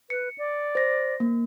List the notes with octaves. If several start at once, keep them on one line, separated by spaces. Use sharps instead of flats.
B4 C#7
D5
C5 A#6
A#3